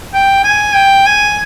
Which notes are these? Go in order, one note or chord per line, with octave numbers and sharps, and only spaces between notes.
G5
G#5
G5
G#5